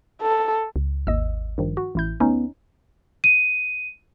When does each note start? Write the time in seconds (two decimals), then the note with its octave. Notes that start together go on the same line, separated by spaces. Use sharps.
0.22 A4
0.76 C#2
1.07 G#1 D#2 D#5 E6
1.58 G2 D#3 F3
1.77 F#4
1.95 A1 E4 G6
2.20 D2 B3 C#4 D#4
3.24 D#7